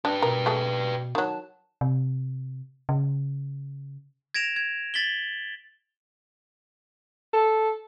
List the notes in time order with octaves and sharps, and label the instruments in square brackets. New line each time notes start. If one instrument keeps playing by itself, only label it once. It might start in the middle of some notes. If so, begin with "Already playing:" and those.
[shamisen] D4 [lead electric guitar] G4 B4
[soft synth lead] B2 [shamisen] A#4
[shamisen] F#3 A3 G#4
[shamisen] D#3 F#3 [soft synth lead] A5
[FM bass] C3
C#3
[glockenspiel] G#6 A#6 D7 E7 F7
G#6
A6 B6 F#7 G7
[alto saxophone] A4